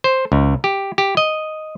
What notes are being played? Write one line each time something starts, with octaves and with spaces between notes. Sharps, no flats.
C5
C#2
G4
G4
D#5